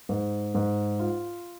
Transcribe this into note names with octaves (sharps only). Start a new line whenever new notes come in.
G#2
G#2
F4